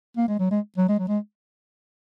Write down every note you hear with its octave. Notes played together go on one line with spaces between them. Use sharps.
A#3
G#3
F#3
G#3
F#3
G#3
F#3
G#3